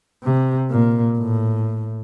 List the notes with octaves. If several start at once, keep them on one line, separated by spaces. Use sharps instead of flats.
C3
A#2
A2